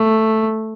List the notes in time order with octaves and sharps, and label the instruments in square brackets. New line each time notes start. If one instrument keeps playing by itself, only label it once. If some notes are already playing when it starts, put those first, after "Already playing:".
Already playing: [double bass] A3